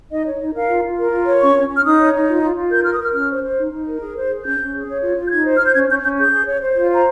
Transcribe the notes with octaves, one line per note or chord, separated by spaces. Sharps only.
D#4 D#5
C#5
D#4
A#4 F5
F4
F4
A#4
F4
C#5
C#4 C#6
C#4
C#4
F6
D#4 D#6
C#5
D#4
F4
F4
F4
A#4 G6
A#4 F6
D#6
A#4 F6
C#4 F6
C5
C5
D#4
D#4
A#4
G#4
C5
G#4
C#4 G6
C#4
G#4
C#5
F4
F4
G6
D#4 G#6
C5
F6
C5 G6
C#4 G#6
C#4 G6
C#4 G6
G#4 G6
G#4
C#5
C5
F4
C5 A#5